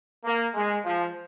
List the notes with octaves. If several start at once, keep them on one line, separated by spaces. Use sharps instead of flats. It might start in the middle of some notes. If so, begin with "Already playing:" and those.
A#3
G#3
F3